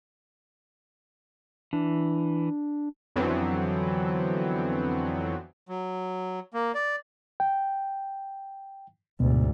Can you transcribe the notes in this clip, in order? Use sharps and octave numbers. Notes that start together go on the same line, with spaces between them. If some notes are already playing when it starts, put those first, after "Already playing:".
E3 D4
F2 D3 E3 F#3 B3 C4
F#3
A#3
D5
G5
D2 G#2 B2